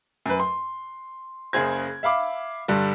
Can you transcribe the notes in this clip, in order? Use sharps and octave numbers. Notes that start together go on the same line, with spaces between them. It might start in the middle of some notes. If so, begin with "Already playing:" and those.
F#2 B4
C6
F#1 C#3 G#4 C5 G#6
E5 F5 B5 D6
G2 D3 G3